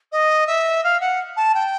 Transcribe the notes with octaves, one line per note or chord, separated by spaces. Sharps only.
D#5
E5
F5
F#5
A5
G5